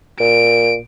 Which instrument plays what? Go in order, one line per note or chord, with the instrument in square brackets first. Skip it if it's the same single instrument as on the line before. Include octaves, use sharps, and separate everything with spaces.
[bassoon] A#2 [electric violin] D7